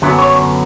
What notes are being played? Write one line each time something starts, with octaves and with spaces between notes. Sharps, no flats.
F#2 D3 F#3 B3
C#5